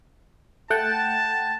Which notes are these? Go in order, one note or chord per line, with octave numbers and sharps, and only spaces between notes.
A3 F#5 G5 A5